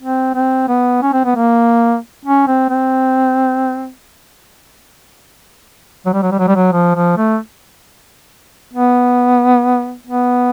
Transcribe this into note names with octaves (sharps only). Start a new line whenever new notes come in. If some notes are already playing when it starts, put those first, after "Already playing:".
C4
C4
B3
C#4
C4
B3
A#3
C#4
C4
C4
F#3
G3
F#3
G3
F#3
G3
F#3
F3
F3
A3
B3
B3